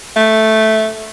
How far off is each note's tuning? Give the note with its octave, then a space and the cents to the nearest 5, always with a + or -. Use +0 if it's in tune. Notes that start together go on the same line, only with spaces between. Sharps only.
A3 -5